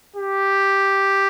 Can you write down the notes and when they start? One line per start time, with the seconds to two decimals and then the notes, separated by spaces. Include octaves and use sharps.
0.16 G4